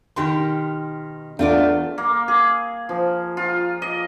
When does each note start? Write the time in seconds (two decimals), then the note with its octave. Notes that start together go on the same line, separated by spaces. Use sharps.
0.16 B2 D#3 G4 C6
1.39 E2 A3 D4 F4 D5
1.98 A#3
2.28 G#4
2.89 F3
3.37 F4
3.82 D#5